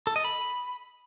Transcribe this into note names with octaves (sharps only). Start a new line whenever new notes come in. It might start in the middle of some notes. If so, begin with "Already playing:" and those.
A4
D#5
B5